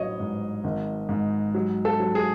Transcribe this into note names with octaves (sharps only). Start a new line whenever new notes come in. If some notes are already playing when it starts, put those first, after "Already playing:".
Already playing: A1 F#3 C#5 D#5
G#2
G#1
G#2
F#3
A4
F#3
G#4